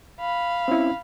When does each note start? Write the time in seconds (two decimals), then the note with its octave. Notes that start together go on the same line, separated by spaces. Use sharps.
0.20 F5 B5
0.68 C4 C#4 E4